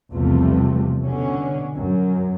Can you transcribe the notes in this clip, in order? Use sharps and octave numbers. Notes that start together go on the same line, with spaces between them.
B1 E2 C3 F3 G3 A3
B2 D3 C#4
F#2